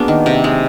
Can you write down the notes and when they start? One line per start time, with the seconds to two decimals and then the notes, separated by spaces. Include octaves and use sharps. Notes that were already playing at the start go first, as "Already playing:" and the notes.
Already playing: A#3 B3 D4 F#4 G#4
0.08 D#3
0.26 C3
0.44 G#3